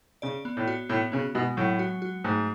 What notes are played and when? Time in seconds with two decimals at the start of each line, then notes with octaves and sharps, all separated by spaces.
0.22 C#3 D5
0.45 B3
0.57 A2
0.67 F#4
0.89 A2 B3
1.12 C#3 B3
1.35 B2 G#3
1.57 A2 F#3
1.79 F#4
2.02 F#4
2.24 G#2 A3